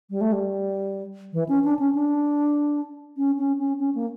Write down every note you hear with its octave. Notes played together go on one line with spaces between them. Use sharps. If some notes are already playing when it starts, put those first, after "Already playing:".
G3
A3
G3
E3
C#4
D4
C#4
D4
C#4
C#4
C#4
C#4
A#3